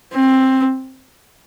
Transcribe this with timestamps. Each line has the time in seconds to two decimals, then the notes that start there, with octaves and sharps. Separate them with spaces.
0.13 C4